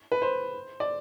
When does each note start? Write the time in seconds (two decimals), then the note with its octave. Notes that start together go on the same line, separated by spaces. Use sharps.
0.12 B4
0.22 C5
0.80 D5